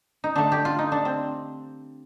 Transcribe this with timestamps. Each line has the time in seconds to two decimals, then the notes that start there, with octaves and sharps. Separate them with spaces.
0.24 D#4
0.36 D3 A3 D4
0.52 G4
0.65 F4
0.79 D#4
0.92 D4
1.05 C4